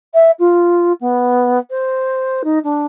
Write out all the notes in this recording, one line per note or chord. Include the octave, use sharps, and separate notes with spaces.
E5
F4
B3
C5
D#4
D4